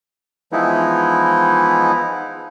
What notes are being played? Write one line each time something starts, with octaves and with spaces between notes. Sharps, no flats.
E3 F3 G#3 B3 D#4 E4